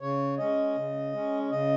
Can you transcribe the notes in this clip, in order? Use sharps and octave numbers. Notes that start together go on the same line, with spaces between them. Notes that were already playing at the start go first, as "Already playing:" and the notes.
C#3 C#5
G#3 C#4 D#5
C#3
G#3 C#4
C#3 D#5